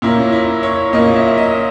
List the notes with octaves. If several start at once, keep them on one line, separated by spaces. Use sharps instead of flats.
A#2 A#3 C#4 E4
E4
C#5
A#2 A#3 C#4 D#5
E5
E5
D#5